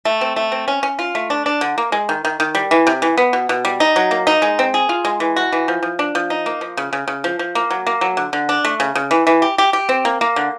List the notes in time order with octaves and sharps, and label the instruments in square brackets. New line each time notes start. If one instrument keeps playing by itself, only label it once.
[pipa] A3
C4
A3
C4
C#4
C#4
F4
A3
D4
D4
D3
A#3
G#3
D#3
D#3
D#3
G3
E3
C3
E3
B3
B2
B2
G3
D#4
F#3
A#3
D#4
G#3
C4
G#4
F4
G#3
E3
F#4
E3
F3
F3
D4
F3
D#4
A#3
F3
C#3
C#3
C#3
F3
F3
A#3
F#3
A#3
F#3
D3
D3
D4
A3
C#3
C#3
E3
E3
G4
G4
G4
C4
A#3
A#3
D3